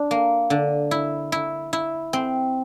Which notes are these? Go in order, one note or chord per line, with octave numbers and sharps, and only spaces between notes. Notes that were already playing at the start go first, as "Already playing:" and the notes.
Already playing: D4
A#3
D3
E4
E4
E4
C4